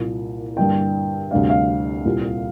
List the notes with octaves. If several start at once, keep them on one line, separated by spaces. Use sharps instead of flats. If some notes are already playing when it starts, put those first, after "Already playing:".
Already playing: C2 A#2 A#3
G2 D3 A#3 D4 G5
D2 C3 G3 D4 F5
F5
C2 A#2 G3 C4